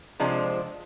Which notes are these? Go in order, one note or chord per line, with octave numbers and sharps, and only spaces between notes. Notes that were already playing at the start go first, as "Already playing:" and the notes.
C3 F3 G#3 D4